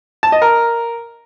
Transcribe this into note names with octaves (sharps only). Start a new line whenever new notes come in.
A5
D#5
A#4